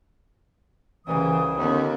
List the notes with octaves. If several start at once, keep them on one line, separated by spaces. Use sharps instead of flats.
C2 C#3 E3 D#6
D#2 D3 B3 C#4